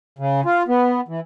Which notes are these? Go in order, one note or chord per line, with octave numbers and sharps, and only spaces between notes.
C#3
F4
B3
E3